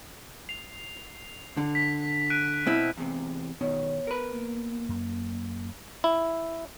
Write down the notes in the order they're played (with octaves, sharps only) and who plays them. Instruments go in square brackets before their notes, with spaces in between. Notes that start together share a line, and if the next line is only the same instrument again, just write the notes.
[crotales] C7 F7
[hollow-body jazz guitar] D3
[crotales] B6
F#6 D7 D#7
[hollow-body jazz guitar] B2 C4 E4 [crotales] D7
[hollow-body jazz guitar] E2 C3
[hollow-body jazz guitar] B2 D#3 [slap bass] B3 [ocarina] C#5
[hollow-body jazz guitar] A#4 B4
[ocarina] A#3
[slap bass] F#2
[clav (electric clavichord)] E4